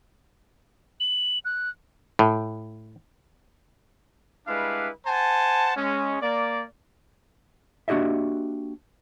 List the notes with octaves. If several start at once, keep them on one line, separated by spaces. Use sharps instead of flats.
F#7
F#6
A2
G3 G#3 D4 E4 B4 F5
C5 F#5 G#5 A5
G#3 C#4
A#3 D5
A#3 D4 F#4 G4 D#5 E5